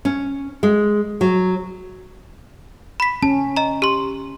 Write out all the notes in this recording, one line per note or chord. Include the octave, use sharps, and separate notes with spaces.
C#4
G#3
F#3
B5 B6
C#4 A5
D#5 A#5
G4 C6